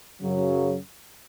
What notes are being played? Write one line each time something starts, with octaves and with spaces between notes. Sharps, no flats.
F#2 C#3 F#3